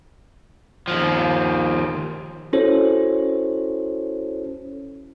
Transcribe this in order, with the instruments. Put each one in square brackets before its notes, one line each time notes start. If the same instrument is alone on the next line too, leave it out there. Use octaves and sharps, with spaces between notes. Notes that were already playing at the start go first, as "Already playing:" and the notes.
[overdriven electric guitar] D#2 F3
[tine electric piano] C#4 E4 F#4 A4 C5 C#5